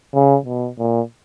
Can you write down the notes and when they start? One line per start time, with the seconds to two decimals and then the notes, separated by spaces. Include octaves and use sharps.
0.14 C#3
0.46 B2
0.78 A#2